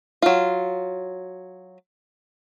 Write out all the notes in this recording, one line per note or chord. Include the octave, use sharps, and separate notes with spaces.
F#3 F4